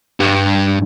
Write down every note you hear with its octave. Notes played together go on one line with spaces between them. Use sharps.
G2